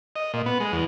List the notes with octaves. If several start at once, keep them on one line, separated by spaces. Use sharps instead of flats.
D#5
A#2
B3
G#3
E2